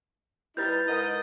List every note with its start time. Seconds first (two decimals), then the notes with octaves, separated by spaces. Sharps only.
0.57 G3 D#4 E4 B4 G6 A6
0.88 G#2 A#4 D#5